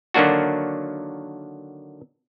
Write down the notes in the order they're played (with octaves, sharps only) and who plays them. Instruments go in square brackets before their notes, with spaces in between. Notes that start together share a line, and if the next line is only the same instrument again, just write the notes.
[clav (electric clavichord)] D3 D#3 F#3 A#3 D4 F#4